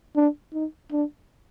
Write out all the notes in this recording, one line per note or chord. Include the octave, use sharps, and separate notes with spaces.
D4
D#4
D4